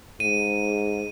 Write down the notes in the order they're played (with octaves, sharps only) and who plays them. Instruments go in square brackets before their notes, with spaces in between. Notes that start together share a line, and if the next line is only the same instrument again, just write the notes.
[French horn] G#2 [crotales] D#7